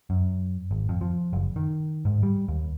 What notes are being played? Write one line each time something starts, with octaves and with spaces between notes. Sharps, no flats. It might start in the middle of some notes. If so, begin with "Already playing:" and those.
F#2
G#1
F2
F3
F#1
D#3
G#2
G3
D#2